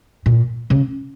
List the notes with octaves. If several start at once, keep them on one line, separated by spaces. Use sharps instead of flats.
A#2
C#3